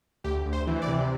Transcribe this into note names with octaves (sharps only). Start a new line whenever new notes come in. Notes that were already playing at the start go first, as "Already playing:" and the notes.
D2 G4
D2
C5
E3
D5
C3